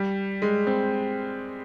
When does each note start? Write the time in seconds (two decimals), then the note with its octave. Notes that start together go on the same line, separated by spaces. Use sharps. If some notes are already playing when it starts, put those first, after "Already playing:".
Already playing: G3
0.42 G#3
0.67 C4